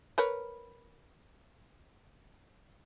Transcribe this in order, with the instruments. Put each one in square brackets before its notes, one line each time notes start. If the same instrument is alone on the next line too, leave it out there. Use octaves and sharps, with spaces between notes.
[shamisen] A#4 B4 C#5